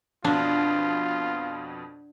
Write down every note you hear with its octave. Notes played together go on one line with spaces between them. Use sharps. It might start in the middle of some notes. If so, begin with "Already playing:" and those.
F2 B2 D4 F4